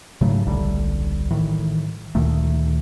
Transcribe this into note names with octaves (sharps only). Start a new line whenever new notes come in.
G#2 C#3 F#3 A3
D1 A#1 D3 G3
A2 D#3 E3
D2 A#2 D#3 A3